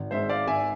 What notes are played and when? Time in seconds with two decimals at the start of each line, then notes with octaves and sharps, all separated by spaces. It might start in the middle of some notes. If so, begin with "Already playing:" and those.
Already playing: G#1
0.11 G#2 G#3 C5 E5
0.29 D5 F5
0.47 G#1 E5 G#5